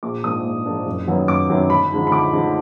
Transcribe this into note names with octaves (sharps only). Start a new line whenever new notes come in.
A#1 D6
G#2 F3 A#3 D4 D#6
A#1
G#2 F3 A#3 D4
F#1
F#2 D#3 F#3 B3
F#1 D6
F#2 D#3 F#3 B3
D2 B5
D3 F3 G#3 D#4
B5
D2 D6
D3 F3 G#3 D#4